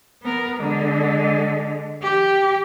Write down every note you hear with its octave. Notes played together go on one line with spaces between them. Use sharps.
B3 A#4
D3 G#3
G4